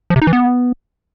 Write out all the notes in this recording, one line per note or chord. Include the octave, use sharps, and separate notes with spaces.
F3
C3
D#4
E3
B3